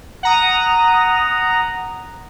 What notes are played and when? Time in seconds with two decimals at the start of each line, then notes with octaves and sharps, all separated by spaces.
0.23 F#5 A#5 D#6